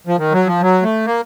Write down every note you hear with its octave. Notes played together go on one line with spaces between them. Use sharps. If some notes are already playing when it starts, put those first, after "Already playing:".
F3
D#3
F#3
F3
F#3
A3
A#3